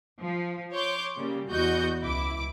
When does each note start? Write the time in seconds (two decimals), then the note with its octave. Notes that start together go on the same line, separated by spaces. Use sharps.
0.20 F3
0.73 C#5 C6 D6 G6
1.17 C#3 G3 A#3
1.49 E2 F#4 D#5 G6 C#7
2.03 C#2 E4 D6